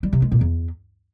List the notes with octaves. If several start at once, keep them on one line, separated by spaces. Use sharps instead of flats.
G3
C3
G#3
A#2
E2